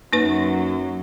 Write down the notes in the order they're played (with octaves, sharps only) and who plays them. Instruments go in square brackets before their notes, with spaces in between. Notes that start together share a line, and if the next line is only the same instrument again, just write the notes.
[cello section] F#2 F#3 [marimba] A#3 D#4 B4